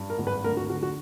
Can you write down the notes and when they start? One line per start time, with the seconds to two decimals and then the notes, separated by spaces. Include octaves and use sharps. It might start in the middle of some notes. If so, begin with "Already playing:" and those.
Already playing: G2
0.10 A#4
0.18 G#1
0.27 B4
0.44 D2 A#4
0.57 F#4
0.70 D3 F#4
0.83 F#4